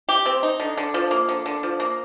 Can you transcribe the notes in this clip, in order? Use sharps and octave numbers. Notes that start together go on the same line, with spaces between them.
G4
C4
D#4
D3
D3
F3
A#3
D3
D3
F3
A#3